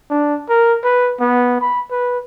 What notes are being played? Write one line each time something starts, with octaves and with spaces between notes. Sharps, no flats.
D4
A#4
B4
B3
B5
B4